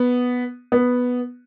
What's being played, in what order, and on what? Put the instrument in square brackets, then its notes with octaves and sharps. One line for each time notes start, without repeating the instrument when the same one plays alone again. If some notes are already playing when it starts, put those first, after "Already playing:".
Already playing: [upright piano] B3
B3